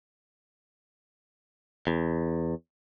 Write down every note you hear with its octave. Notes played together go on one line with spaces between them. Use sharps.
E2